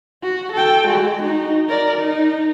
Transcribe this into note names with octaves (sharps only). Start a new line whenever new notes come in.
F#4
A4 G5
G#3 F#4
D#4 F#4
A#4 D5
D#4